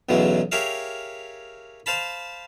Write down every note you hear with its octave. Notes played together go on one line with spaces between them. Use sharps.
B1 E2 C#3 E3 F#3 G#3
G4 G#4 A#4 C#5 E5 F5
C5 F5 A5 B5